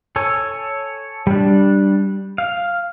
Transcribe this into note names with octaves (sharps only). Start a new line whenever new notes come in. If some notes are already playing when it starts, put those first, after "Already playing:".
A4 C#5 G#5
G3 D4
F5